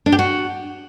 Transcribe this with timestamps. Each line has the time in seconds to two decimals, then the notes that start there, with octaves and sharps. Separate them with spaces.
0.06 D4
0.12 G4
0.19 F#4